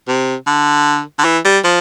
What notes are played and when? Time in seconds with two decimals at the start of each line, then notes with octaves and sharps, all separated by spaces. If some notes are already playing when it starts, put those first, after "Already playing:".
0.08 C3
0.47 D3
1.19 D3
1.25 E3
1.45 G3
1.64 F3